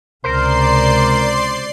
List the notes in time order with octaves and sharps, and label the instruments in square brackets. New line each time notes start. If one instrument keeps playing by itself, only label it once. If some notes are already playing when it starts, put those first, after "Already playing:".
[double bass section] C#2 C3 [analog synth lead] A#4 [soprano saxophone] C5 [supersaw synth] D5 C6 C7